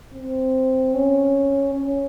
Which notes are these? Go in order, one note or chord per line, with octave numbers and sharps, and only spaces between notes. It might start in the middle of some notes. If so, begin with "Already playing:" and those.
C4
C#4
C#4